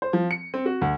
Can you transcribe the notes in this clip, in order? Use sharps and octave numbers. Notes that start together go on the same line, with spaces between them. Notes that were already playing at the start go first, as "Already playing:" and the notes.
C5
F3
C#7
C4
F#4
D2